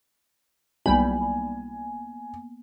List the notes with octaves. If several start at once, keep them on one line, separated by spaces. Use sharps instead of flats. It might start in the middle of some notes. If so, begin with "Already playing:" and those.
B1 G3 A#3 B3 G#5 B5